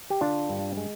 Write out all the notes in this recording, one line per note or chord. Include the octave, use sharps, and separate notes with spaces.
G4
D3 D4 F4
G2
G#3